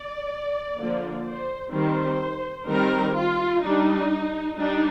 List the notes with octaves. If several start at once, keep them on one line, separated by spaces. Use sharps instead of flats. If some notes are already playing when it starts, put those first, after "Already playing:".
Already playing: D5
D3 F3 A#3
C5
D#3 G3 C4 C5
D#3 G3 C4 A#4
F4
G3 D4 D#4
G3 D4 D#4